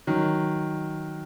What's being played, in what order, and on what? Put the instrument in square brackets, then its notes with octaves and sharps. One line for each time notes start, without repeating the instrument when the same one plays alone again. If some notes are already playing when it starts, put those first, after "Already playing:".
[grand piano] D#3 F#3